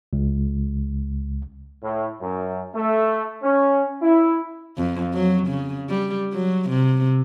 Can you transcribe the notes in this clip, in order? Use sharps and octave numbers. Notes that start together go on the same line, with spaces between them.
C#2
A2
F#2
A3
C#4
E4
F2
F#3
C#3
G3
F#3
C3